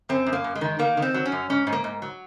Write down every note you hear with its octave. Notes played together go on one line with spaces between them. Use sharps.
F#2 C4
F#2
A#3
F#2
G#3
D#3
D#3 A#3
D#3
C4
F#3
C#4
F#2
G#2 C#4
G#2
A#3
G#2
F#3